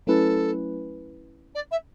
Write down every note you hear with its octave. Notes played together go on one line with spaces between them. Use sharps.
F#3 A3 C#4 E4 A4 B4
D5
E5